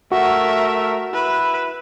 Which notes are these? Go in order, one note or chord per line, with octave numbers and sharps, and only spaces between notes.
A3 F#4 A#4 E5
E4 B4